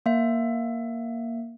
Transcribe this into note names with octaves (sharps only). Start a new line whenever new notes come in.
A#3 E5